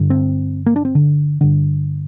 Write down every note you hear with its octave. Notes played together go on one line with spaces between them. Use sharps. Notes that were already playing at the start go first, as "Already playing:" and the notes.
Already playing: G2 D3
C4
A#3
D4
C4
D3
G2 D3